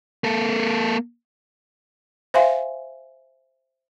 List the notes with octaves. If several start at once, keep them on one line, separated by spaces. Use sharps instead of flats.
A#3 A4
C5 E5 F5 G#5 C6